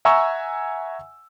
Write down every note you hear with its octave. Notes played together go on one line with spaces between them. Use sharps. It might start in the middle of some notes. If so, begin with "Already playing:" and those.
E5 F#5 G#5 A#5 C#6 E6